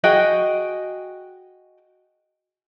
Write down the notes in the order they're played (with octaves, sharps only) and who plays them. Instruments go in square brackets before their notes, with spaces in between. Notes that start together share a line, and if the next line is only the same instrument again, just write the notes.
[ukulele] F#4 G#4 D#5 G5